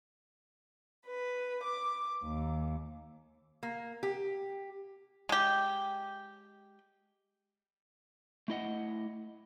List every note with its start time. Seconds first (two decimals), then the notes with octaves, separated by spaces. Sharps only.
1.06 B4
1.62 D6
2.25 D#2
3.63 A#3
4.03 G4
5.29 G#3 G4
8.48 A3 E4 D#5 F#5